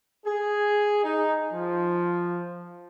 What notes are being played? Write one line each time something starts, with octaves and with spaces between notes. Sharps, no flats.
G#4
D#4
F3